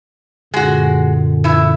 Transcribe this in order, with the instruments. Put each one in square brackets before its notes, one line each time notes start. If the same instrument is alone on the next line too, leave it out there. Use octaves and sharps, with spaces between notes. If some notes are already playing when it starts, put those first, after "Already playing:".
[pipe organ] F#2 A#2 D3 [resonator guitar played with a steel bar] G#3 F#4
[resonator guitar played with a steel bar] E3 E4